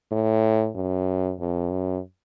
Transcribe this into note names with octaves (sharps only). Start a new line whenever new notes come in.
A2
F#2
F2
F#2